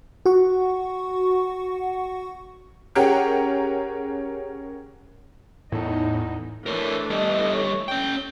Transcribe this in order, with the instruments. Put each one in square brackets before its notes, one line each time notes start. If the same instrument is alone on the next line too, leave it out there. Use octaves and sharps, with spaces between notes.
[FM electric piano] F#4 F#5 C#6
[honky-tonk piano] C#4 G4 G#4 A#4 F#5 G5
[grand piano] E2 A4 [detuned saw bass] A2 [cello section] B3 D#4
[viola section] E3 A3 D4 [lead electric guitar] A#4 C#5
[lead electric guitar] G3 A4 [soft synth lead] D#5
[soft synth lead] C#5
[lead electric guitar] C#4 G5 [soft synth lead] G6